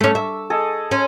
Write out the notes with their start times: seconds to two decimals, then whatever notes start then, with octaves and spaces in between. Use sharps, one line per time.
0.01 A3 C#4 C#6 D6
0.15 E5 E6
0.50 G#4 A4 D#5
0.91 C#4 C6